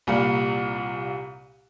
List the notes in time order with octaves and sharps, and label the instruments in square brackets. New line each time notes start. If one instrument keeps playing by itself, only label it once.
[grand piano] C2 A#2 G3 F5